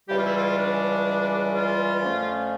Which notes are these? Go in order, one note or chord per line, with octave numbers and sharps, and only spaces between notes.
C#2 C#3 E3 G3 G4
F4
E4
F4
D4
F4
F2 D3 F3 A3 C#4